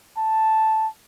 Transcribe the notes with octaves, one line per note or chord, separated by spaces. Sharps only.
A5